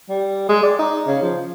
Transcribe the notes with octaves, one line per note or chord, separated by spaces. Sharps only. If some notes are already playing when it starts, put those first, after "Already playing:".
G3
G#3
D5
D#4
C#3
F3